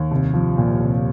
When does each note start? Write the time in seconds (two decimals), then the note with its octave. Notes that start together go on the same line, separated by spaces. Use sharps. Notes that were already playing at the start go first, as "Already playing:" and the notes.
Already playing: D#2
0.11 C2
0.34 F3
0.58 A#2
0.80 C2